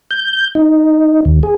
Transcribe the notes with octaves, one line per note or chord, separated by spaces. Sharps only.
G6
D#4
D#2
G#4